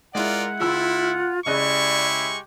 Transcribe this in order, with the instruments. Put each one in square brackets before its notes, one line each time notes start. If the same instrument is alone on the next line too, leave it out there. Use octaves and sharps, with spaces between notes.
[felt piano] G#3 E4 [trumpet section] F4 A#4 D5 [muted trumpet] F#5
[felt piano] C#2 E6 [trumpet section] E4 [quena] F4
[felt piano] C#3 D#5 F#6 [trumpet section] G#3 G4 C#6 [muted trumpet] E4 [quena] D5